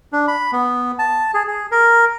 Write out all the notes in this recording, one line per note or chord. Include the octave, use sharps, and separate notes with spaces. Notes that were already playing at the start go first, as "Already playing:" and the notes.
D4
B5
B3
A5
G#4
G#4
A#4